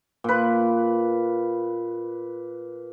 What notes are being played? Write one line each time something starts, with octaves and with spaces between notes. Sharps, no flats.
A#2 B4